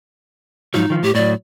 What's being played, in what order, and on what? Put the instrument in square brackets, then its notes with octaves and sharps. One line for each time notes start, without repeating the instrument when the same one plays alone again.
[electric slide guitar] G#2 F3 F#3 [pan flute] D#4
[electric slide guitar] D#3 F3
[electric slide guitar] A2 [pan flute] G4
[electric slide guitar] A2 F#3 [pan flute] D5